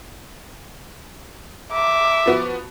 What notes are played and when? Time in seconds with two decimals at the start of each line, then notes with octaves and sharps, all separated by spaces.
1.72 E5 D6
2.26 F3 B3 F#4